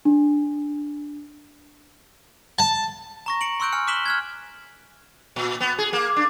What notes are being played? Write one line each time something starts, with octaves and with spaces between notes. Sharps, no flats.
D4
A5
A#5 C#6 A#6
C#7 D7 F#7
C6 C#6 E6 F#6 G6 D7
G#5 F6 C#7
D6 F#6 B6 E7 F#7 G7
F6 F#6 G#6
A#2
B3
G#4
A#3
D4